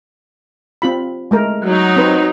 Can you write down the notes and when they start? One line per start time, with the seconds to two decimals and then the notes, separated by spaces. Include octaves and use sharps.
0.82 C4 F4 B5
1.31 G#3 A3 A#4
1.64 F#3 D#4
1.97 C4 B4 C5